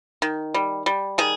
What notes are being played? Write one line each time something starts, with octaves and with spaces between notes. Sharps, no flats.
D#3
G3
G3
D#3 G#4